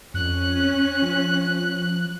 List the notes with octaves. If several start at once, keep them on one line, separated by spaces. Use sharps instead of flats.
F2 C#4 F#6
F3